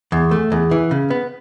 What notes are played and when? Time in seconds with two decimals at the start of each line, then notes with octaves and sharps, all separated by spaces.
0.12 E2
0.31 A3
0.52 E2
0.71 E3
0.91 C#3
1.10 B3